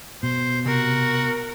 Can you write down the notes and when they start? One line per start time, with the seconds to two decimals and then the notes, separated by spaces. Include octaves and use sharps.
0.23 B2 C5
0.66 C3 F#4 A#4